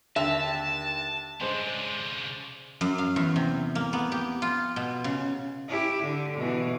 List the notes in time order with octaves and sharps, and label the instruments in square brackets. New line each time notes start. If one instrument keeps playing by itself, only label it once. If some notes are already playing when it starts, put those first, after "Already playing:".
[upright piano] D#2 D3 F7 [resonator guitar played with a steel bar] E5 [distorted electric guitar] A5
[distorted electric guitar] C#3 D4 [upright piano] G#3 C5
[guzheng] F#2
F5
E2
C3
A#3
B3
G4
F4
B2
C#3
[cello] E4 G4
D3
B2 E3